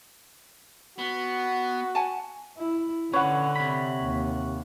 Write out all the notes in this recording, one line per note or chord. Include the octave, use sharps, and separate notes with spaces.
B3 F#4
F#5 G#5 A5
E4
D3 C#4 B4 C#5 F#5
C3 B5
D#2